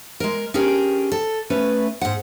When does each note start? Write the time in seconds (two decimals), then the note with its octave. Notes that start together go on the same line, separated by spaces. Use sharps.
0.20 G#3 A#4
0.54 C#4 D4 G4 G#4 A#4
1.12 A4
1.50 A3 C#4 B4
2.01 G#2 F#5